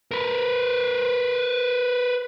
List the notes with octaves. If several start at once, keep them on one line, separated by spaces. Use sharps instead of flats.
A#4 B4